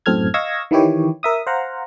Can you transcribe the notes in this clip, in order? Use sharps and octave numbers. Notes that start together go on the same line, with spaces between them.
F#2 A2 C4 A4 F6 G#6
D#5 F5 C#6 E6 G#6 A#6
D#3 E3 E4 G4 C#5
A#4 E5 D#6
C5 F5 F#5 A#5